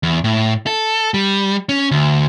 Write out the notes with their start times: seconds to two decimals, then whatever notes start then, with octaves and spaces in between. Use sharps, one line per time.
0.03 E2
0.24 A2
0.67 A4
1.14 G3
1.69 C#4
1.91 D2